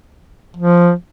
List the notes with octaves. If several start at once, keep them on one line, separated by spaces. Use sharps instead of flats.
F3